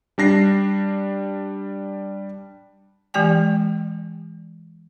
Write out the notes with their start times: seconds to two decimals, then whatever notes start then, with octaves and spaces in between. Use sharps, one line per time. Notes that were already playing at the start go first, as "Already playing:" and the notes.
0.18 G3 D4 A#6 C7
3.14 E3 G#3 G4 D5 G5 G#5